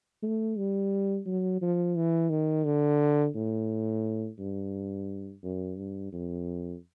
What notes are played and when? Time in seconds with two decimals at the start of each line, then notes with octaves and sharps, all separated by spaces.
0.22 A3
0.57 G3
1.26 F#3
1.61 F3
1.96 E3
2.30 D#3
2.65 D3
3.35 A2
4.38 G2
5.43 F#2
5.77 G2
6.12 F2